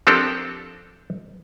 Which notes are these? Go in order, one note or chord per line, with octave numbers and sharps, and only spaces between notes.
F3 C4 D4 G4 A4 A#4